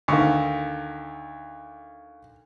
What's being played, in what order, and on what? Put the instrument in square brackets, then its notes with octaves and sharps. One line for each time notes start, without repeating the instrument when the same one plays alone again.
[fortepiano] D2 D#3 [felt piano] F5 C#6